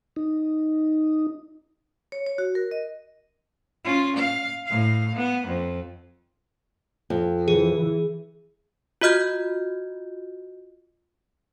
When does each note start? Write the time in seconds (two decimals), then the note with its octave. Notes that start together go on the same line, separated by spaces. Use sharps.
0.16 D#4
2.12 C#5
2.26 C#5
2.38 F#4
2.55 A#4
2.71 D#5
3.84 C#4 F4
4.18 F5
4.67 A2 F5
5.16 B3
5.47 F2
7.10 F2
7.48 E3 G#4
9.01 F4 F#4 D#5 F6 G6 G#6